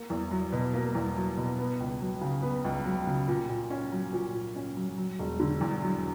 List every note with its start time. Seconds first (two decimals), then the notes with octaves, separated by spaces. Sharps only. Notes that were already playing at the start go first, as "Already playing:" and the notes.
Already playing: A#3
0.10 E2
0.31 F#3
0.52 B2
0.74 A#3
0.95 E2
1.16 F#3
1.37 B2
1.59 B3
1.80 C#2
2.01 F#3
2.21 C#3
2.43 B3
2.65 C#2
2.85 F#3
3.07 C#3
3.28 A#2
3.49 A#2
3.70 C#4
3.92 F#3
4.13 A#2
4.34 A#2
4.56 C#4
4.76 F#3
4.97 F#3
5.19 E1
5.40 D3
5.61 E2
5.82 F#3